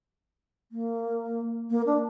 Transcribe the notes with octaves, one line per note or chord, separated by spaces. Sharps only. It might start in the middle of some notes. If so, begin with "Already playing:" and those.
A#3
A#3
D4